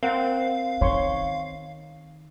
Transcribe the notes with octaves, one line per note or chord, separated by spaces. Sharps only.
C4 A#4 F5 F#5
D#3 C#5 C6 C#6